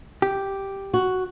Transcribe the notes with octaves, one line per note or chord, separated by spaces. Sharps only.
G4
F#4